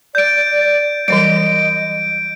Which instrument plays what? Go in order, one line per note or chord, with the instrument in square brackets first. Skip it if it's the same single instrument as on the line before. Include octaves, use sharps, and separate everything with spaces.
[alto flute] D5 [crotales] G6 D7
[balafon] E3 F#3 G3 [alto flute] D#5 [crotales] D7